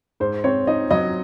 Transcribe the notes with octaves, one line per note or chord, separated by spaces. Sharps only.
G#2 C5
C4 C#5
D#4 D#5
F#3 D#5